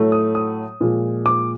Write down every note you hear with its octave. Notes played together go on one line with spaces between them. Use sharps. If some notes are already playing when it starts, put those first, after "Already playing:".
Already playing: A2 F#3 A3
D#6
D#6
A#2 F3 G#3
D6